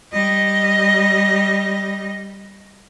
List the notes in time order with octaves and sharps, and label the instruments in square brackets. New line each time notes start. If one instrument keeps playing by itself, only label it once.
[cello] G3 D#5